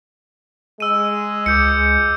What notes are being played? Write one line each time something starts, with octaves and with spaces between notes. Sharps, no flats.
G#3 E6 D#7
C#2 D6 G6 C#7